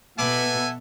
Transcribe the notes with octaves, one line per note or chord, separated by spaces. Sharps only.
B2 A4 B4 E5 F#5 G#5 D6